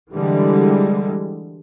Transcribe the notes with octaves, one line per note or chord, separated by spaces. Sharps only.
D3 E3 G3 G#3